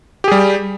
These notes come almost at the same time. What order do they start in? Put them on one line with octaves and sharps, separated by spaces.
G4 G#4 G3